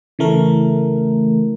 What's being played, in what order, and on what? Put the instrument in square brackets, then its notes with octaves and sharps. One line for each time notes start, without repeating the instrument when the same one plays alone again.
[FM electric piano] C#3 E3 A3 A#4